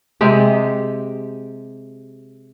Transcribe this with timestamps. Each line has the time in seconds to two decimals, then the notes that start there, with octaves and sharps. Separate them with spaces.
0.21 C3 G#3 G4